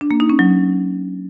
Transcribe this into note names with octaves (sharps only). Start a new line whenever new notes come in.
D4
A#3
D#4
C#4
F#3